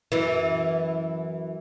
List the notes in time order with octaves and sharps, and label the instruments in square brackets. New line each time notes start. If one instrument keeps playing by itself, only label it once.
[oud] F#2 E3